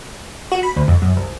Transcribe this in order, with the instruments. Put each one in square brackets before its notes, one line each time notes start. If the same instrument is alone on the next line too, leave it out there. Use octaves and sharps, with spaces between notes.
[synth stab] F#4
B5
D2
F2
F#2
C2